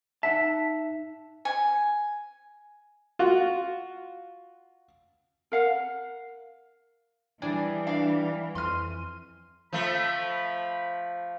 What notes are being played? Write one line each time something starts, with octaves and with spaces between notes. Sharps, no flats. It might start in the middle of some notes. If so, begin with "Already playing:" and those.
D#4 E5 F#5 A5 B6
G#5
F4 F#4
A#4 F5 F#5
E3 G3 D4 G#4 D5
D4 F5
F2 C6 F6 D#7
F3 A3 B5